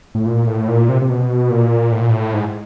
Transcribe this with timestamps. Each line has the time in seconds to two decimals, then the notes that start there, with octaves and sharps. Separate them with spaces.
0.15 A2
0.26 A#2
0.47 A2
0.68 A#2
0.89 C3
1.02 C3
1.09 B2
1.50 A#2
1.92 A2
2.00 A#2
2.10 A2
2.34 G#2